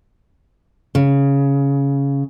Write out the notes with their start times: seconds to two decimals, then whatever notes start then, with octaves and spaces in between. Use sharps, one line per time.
0.95 C#3